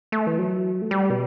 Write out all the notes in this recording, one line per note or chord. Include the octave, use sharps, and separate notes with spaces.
A3
E3
F#3
A3
G3
B2